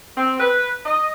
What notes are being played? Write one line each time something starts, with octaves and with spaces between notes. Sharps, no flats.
C4
B4
D#5